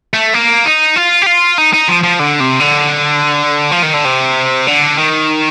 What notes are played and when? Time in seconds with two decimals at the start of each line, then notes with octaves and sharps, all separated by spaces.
0.14 A3
0.34 A#3
0.65 D#4
0.96 F4
1.22 G4
1.26 F4
1.58 D#4
1.74 D#4
1.88 F3
2.03 F3
2.20 D3
2.40 C3
2.60 D3
3.72 F3
3.83 D#3
3.94 D3
4.05 C3
4.67 D3
4.98 D#3